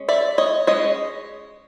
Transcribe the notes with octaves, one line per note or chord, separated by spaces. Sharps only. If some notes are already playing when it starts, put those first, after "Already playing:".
Already playing: G#3 C#4
D5 E5
C#5 D#5
G#3 C#4 C#5 D#5